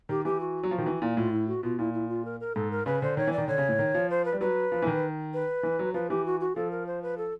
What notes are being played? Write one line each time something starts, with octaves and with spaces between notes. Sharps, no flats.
D#3 G4
E3 G4
F#4
F#3
F3
D#3
E3
A#2 E4
A2 F4
E4
F#4
B2 F4
A#2 E4
E4
F4
A#4
A#4
G#2 A4
A#4
C#3 B4
D3 C5
D#3 C#5
E3
D5
D#3
D3 C#5
C#3
A2
D#3
F3
C5
B4
G3
F#3 B4
F3
E3
D#3
B4
E3
F#3
F3 B4
E3 G4
F#4
F#4
F3 A4
A#4
C5
B4
A4